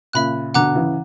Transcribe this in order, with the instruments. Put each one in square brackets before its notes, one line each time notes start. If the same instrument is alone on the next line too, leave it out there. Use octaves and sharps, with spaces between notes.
[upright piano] A#2 C#3 [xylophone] E5 B5 F#6
[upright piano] B2 D3 [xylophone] F#5 A#5 D6 F#6
[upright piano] C#3 E3